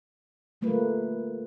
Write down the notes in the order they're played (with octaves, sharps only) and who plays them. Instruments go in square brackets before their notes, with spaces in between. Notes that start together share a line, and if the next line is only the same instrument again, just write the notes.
[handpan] D3 G3 A3 A#3 F4 B4